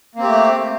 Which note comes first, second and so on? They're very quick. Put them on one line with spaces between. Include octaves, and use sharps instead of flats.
A#3 C4 G4 A3